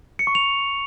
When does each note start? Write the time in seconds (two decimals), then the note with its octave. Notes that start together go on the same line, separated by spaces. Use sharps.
0.19 C#7
0.27 C#6
0.35 F7